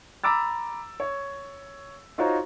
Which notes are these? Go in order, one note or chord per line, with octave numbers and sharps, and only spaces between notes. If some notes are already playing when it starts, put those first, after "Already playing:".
A#5 B5 D6 E6 A6
C#5
D#4 F4 F#4 C5 C#5 A#5